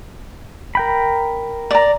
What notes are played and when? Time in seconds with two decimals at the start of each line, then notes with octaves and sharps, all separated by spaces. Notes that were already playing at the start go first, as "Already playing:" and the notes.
0.75 A#4 G5 B5
1.71 D5 A#5